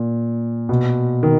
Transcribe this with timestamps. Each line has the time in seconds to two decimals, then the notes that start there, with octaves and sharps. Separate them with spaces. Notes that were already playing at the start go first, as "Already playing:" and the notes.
Already playing: A#2
0.69 B2
1.23 D#3